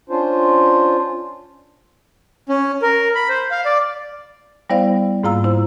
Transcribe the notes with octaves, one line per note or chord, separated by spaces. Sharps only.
C#4 D4 F4 C5
C#4
A#4
B5
C5
F5
D5
G3 B3 E4 C5 D5 F5
G#2 A#3 F4 F5 A#5 E6
E4 C5